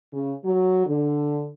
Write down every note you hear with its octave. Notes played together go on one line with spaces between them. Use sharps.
C#3
F#3
D3